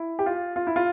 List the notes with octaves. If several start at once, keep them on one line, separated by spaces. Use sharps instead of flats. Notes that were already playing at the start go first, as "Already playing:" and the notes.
Already playing: E4
G4
F4
F4
E4
F4